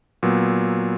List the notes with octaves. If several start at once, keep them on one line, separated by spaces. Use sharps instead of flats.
A#2 F#3 B3